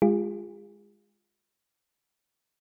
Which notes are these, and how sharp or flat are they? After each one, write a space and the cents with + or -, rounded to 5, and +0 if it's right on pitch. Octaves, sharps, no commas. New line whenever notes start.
G#3 -10 F4 +0 G#4 -40